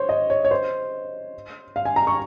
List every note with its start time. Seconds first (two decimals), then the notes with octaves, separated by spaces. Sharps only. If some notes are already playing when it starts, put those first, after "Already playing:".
Already playing: C5 C#5
0.09 D#5
0.30 C#5
0.45 C#5
0.51 C5
1.76 F5
1.85 G#5
1.96 A#5
2.07 C#6